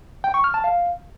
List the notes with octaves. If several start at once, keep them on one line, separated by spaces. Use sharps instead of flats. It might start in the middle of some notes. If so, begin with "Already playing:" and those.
G5
C#6
F6
A5
F5